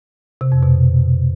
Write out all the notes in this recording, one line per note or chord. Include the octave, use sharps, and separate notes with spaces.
C3
F2
B2